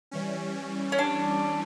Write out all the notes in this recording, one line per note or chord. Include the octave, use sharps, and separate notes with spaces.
E3 G3 C#4
C#4
D4